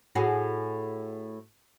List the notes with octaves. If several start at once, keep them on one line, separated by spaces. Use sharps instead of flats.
A2 F#4 G#4